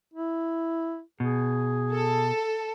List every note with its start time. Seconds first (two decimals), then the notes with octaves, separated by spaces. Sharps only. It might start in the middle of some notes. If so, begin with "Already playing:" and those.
0.13 E4
1.20 B2 G#4
1.92 A4